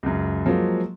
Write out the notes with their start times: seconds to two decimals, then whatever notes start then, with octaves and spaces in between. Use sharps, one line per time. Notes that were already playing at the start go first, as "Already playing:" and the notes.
0.03 C#2 F#2
0.46 F3 F#3 G#3 A#3